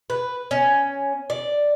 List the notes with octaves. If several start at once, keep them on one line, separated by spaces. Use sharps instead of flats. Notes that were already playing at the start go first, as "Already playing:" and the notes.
B4
C#4
D5